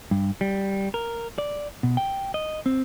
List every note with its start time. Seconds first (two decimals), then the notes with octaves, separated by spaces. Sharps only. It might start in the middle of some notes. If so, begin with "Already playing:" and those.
0.11 G2
0.41 G3
0.94 A#4
1.38 D5
1.83 B2
1.97 G5
2.34 D#5
2.66 C4